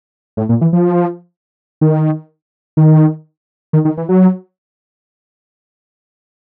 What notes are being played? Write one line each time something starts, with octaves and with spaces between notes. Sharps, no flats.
A2
A#2
E3
F3
D#3
D#3
D#3
D#3
E3
F#3